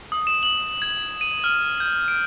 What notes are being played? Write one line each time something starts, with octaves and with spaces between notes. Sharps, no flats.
D#6
E7
F#7
G#6
D#7
F6
G6
D7